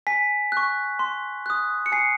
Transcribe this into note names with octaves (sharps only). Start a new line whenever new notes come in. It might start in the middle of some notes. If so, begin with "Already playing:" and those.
G#5 B6
C#6 F#6
C6
D#6 F#6
C#7
G#5 C7